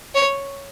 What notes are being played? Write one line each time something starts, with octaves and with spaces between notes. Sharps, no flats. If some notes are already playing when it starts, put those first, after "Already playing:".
C#5